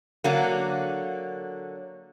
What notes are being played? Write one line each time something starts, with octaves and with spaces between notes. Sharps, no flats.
D3 F#3 A#3